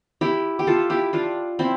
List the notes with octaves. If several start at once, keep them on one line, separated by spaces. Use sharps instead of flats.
E4 G4
G4
F4 A4
E4 G4
D4 F4
C4 E4